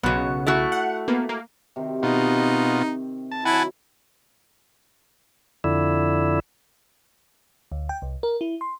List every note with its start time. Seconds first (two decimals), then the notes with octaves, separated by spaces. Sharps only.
0.03 B1 C#3 B3 F#4
0.47 A3 E4 F#4
0.72 F#5
1.08 A#3 B3
1.29 A#3
1.76 C3 D#3 C4
2.03 B2 D#4 F4
3.31 A5
3.45 D#3 F#3 E4 F#5 G#5 A5
5.64 F2 D3 E4
7.72 D2
7.89 G5
8.02 C2
8.23 A#4
8.41 E4
8.61 C6